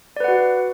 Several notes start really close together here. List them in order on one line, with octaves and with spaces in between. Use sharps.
D5 B4 F#5 F#4